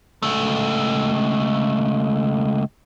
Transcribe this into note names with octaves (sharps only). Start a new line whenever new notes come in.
C#2 A3